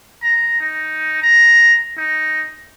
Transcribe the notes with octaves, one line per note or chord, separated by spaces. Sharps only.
A#5
D#4
A#5
D#4